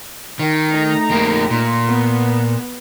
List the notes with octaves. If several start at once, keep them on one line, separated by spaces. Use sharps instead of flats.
D#3
A3 D#4 A#5
F2 A#3
A#2
B3